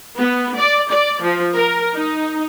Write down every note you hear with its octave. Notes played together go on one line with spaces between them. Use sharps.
B3
D5
D5
F3
A#4
D#4